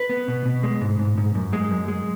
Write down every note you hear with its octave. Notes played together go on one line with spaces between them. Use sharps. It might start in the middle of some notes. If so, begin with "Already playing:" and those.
Already playing: B4
B3
B2
B2
G#3
G#2
G#2
G#2
F#2
G#3
F#2
G#3